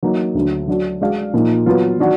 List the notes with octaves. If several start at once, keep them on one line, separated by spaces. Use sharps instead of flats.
F#3 A#3 D#4
D2 D3 F#3
F#3 D4 F#4
G#3 D4 F#4 D5 F5
A#2 F3 A#3 D#4
F#3 B3 F4 B4
D#3 F#3 D4 F#4